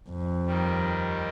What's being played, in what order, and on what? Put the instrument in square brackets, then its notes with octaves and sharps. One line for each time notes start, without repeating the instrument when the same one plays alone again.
[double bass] F2
[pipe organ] D#2 D#3 G3